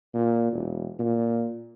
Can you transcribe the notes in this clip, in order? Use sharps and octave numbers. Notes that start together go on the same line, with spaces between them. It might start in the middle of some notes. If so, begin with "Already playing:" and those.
A#2
E1
A#2